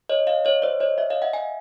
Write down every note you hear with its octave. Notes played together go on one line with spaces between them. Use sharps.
C#5 D#5
D#5 F5
C#5 D#5
C5 D5
C#5 D#5
D5 E5
D#5 F5
E5 F#5
F#5 G#5